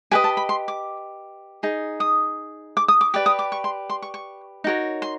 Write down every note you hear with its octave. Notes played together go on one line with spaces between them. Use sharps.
G4 B4 D#5 G#5
A5
B5
C6
D6
D#4 G#4
D#6
D6
D#6
D6
G4 B4 D5 D6
D#6
D6
C#6
C6
C6
C#6
C#6
D#4 F#4 A#4 C#5
C6